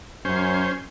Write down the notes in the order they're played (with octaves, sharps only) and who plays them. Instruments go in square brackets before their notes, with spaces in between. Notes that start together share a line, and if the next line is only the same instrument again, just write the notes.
[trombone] F#2 [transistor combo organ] C#4 C5